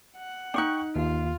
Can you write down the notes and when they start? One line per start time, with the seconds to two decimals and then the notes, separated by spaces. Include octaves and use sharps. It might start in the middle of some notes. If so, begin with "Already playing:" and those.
0.17 F#5
0.54 D4 D#4 G5 C#6 F#6
0.96 D#2 F4